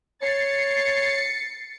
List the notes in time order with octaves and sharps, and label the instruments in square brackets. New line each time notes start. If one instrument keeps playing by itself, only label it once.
[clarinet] C#5 [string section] A6 C7 C#7